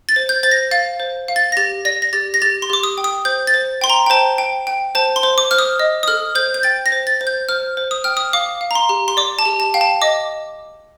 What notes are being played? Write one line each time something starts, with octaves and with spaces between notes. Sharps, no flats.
A6
C5
G6
C5 A6
A#6
F5 A6
C5
F5
A6
A#6
G4 A6
D5 A#6
A#6
G4 A6
A#6
G4 A6
C6
G4 D6
D#6
G5
D#6
C5 G6
A6
C5
G5 C6
A#5
G5
C5 A5
G5
G5
C5 A5
C6
C5
D6
C5 F6
D#6
D#5
D#6
A4 F6
C5 G6
G6
G5 A6
A#6
C5
A6
C5
G6
C5 F6
C5
D#6
G5 F6
D#6
F5 D6
F5
A#5
C6
G4
C6
D5 D6
A5
G4
A5
F5 G5
A5
D#5 D6